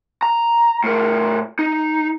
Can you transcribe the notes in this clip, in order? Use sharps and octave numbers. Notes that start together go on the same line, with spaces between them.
A#5
A2 A#4
D#4